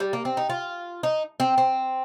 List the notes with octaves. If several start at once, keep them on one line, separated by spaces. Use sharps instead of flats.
G3
A#3
C4
D#4
F4
D#4
C4
C4